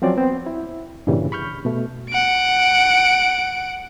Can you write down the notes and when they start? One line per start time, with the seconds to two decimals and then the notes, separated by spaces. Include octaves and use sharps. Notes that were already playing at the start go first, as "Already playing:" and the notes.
0.02 F3 F#3 C4 C#4 D5
0.17 B3 C4
0.46 E4
1.07 G2 A#2 C#3 E3 G3
1.32 B5 C#6 F6 G6
1.65 B2 A3
2.10 F#5 D7